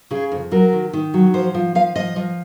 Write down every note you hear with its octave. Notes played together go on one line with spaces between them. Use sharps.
C#3 G#4
F2
F#3 A#4
D#3
D#3
F#3
F3 C5
F3
F3 F5
F3 D#5
F3